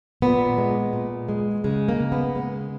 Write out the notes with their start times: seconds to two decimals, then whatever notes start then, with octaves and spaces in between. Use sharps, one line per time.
0.22 A#2 B3
0.58 G#3
0.93 A#2
1.29 G#3
1.64 C#3 G#3
1.89 A#3
2.00 C#3
2.12 B3
2.35 G#3